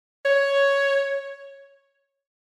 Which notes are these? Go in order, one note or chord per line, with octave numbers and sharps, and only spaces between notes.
C#5